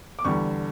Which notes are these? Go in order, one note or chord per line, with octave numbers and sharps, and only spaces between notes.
D6
E2 D3 G3 C#6